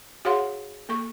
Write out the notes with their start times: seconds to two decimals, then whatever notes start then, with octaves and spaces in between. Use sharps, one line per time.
0.25 F#4 G#4 C#5 F5 F#5 C6
0.89 A#3 A4 C#6